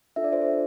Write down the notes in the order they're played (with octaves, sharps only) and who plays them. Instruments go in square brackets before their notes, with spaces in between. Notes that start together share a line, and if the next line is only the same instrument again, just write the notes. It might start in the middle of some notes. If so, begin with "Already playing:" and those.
[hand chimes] D4 F4 A4 E5
D5
C5
D5